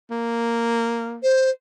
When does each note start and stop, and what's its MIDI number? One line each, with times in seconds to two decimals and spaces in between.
0.10 1.18 58
1.23 1.50 72